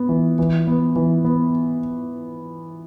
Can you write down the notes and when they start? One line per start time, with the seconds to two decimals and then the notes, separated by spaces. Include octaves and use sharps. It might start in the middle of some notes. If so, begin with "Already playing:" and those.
Already playing: B3
0.09 E3
0.39 E3
0.67 B3
0.96 E3
1.25 B3